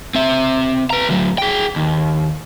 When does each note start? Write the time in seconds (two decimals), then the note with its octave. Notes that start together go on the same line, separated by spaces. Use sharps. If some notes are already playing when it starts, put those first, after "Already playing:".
0.15 C4 E5
0.90 B4 A#5
1.09 D2 F#3
1.38 G#4 G5
1.76 D#2